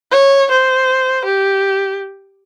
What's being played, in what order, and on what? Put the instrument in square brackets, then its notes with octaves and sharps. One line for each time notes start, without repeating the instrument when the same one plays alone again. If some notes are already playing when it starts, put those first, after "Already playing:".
[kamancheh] C#5
C5
G4